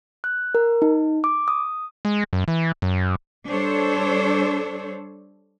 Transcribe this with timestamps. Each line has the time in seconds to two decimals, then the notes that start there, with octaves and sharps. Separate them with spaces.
0.24 F#6
0.55 A#4
0.82 D#4
1.24 D6
1.48 D#6
2.05 G#3
2.33 F#2
2.48 E3
2.82 F#2
3.47 G3 D4 A4 C5 C#5